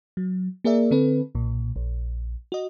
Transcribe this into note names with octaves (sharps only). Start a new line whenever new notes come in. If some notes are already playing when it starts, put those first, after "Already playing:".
F#3
A#3 G#4 A#4 D5 E5
D3 C4 A4 B4
B1 A#2
A#1
F#4 D#5